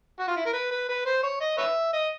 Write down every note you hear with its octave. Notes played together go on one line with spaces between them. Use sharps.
F#4
F4
E4
A#4
B4
B4
B4
C5
C#5
D#5
B4 C#5 E5
D#5